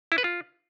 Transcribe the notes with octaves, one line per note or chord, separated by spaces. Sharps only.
E4
B4
F4